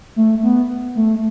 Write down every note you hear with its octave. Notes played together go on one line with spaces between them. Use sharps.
A3
B3
A3